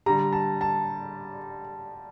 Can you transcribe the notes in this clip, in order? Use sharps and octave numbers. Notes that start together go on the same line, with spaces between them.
D3 G3 A#5
A5
A5